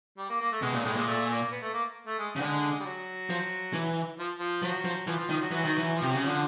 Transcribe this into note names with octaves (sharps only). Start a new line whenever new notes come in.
G3
A#3
A#3
A3
B2 G#3
A#2
A2 G#3
A#2 G#3
A3
A#3
B3
A3
A#3
A3
G#3
C#3
D3 G#3
G3
F#3
F3
E3
F3
F3
F3 F#3
F3
E3 F3
F3
D#3 F3
F#3
E3 F#3
D#3
E3
F3
C3
F#3
C#3
F3
D3